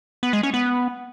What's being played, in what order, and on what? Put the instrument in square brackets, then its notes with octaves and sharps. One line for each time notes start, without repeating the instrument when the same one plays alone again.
[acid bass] B3
G#3
C#4
B3